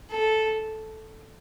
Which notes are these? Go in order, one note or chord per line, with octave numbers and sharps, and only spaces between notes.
A4